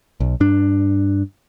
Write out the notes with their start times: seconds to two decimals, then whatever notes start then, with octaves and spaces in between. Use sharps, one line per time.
0.20 B1
0.40 G2 D4